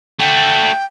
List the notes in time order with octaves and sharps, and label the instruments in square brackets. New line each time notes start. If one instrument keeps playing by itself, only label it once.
[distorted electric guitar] A3 F#4 [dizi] G5